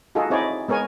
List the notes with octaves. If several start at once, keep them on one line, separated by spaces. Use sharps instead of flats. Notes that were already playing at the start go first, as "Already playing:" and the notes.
D#4 F4 F#4 G#4 A4
C4 D#4 E4 G#4 C#5 D5
G#3 B3 A#4 C#5 G#5